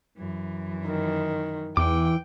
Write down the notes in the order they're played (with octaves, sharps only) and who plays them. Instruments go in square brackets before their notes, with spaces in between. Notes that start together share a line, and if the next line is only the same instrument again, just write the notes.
[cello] F#2 E3
[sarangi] D#3
[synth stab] E2 [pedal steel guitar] E3 D6 [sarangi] G5